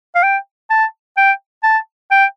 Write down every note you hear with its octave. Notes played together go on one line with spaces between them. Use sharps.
F5
G5
A5
G5
A5
G5